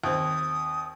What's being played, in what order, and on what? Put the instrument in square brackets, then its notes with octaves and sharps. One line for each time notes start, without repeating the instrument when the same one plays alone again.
[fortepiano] D#2 C4 [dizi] D#6